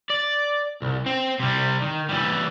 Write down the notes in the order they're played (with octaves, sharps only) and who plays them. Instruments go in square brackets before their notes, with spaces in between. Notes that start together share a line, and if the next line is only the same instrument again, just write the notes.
[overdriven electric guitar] D5
C2
C4
C3 G3
D#3
E3 G3